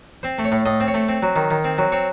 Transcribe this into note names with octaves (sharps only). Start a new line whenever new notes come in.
C4 C5
A3
C#5
A2
A2 D#5
C4
C#5
A3
C4
F#3
D#3
D#3
C4
F#3
C4 C#5